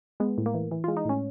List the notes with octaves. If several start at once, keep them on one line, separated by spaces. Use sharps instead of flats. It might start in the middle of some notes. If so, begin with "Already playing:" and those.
G#3 B3
A2
A#3
E3
E3
G#3 F4
D#4
A2 C#4